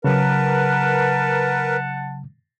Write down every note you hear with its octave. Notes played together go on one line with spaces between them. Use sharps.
C#3 F#3 A#4 B4 F#5 A5